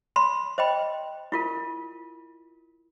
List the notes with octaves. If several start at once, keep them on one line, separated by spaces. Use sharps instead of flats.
B5 C6
C5 D#5 G5 B5
E4 F4 A#4